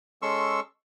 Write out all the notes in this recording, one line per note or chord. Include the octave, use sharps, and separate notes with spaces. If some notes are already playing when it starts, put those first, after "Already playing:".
G#3 C#4 A4 C6 C#6 E6